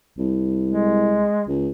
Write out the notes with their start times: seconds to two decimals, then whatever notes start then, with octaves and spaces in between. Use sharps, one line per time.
0.18 C2
0.67 G#3
1.48 C#2